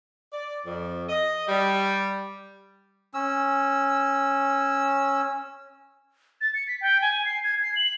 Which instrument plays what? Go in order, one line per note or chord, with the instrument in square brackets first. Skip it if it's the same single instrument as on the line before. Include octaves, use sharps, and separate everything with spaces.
[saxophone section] D5
F2
D#5
G3
[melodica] C#4 E6
[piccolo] A6
C#7
B6
G5
G#5
C7
G#6
C7
F#7